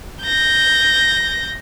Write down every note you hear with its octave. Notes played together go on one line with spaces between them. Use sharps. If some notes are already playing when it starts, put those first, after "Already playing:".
G6 A#6